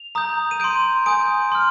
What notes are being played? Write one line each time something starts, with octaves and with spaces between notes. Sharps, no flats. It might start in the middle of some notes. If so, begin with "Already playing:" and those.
Already playing: F7
A#5 D#6 G6
D#7
C6 G6 D7
G#5 D#6 G6 D7
C6 F6